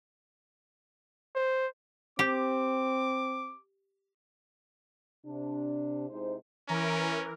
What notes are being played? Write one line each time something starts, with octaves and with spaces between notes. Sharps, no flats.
C5
C4 G4 D6
C3 D4
C3 G#3 D#4 E4 C5
E3 C#4 A#4